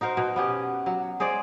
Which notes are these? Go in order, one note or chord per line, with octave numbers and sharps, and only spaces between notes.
D#4 F#4 A#4 C5
B2
B3 C#4 G4
F#3
G#3 G#4 C5 D5